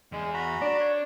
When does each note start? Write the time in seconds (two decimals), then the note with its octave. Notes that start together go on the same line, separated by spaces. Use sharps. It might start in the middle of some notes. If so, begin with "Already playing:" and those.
0.12 E2 G#3 G#4
0.34 F#4 A#5 B5
0.61 D4 D5
0.80 C#5